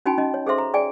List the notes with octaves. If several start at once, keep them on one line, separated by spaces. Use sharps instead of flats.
C#4 D#4 F#4 G5 G#5 B5
C#4 D#4 F#4 D#5
C#5
G#4 A4 C5 E5 C6
A#5
G#4 D5 G5 G#5